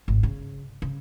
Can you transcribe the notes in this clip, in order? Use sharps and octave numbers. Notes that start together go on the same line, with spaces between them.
G#1
C#3
C#3